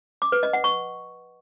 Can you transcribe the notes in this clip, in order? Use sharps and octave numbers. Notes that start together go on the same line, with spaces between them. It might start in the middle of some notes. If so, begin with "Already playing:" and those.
D6
B4
D#5
F#5
C#6